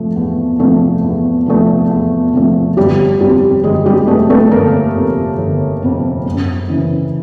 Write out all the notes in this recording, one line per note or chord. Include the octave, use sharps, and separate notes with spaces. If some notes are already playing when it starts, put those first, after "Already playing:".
Already playing: C3 F3 A3
E2
C3 F3 A3
E2
C3 F3 A3
E2
C3 F3 A3
G1 G3 G4
F2 C3 G3 G4
G1 G#3 G#4
G3 G4
F2 C3 A3 A4
A3 A4
G1 A#3 A#4
F2 C3
G1
F2 C3
F#2
C#3 E3